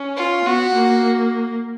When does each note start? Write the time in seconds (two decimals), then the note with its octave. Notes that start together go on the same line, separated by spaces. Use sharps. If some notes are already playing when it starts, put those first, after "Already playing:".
Already playing: C#4
0.17 F4
0.45 B3 F#4
0.75 A#3